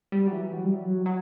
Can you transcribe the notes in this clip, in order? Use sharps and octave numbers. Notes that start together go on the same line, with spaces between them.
G3
F#3
E3
F#3
G3
F#3
F#3